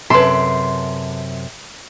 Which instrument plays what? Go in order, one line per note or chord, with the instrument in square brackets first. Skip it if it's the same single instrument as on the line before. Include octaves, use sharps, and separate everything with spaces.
[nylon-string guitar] F#2 C3 [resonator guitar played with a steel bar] A4 B4 [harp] C6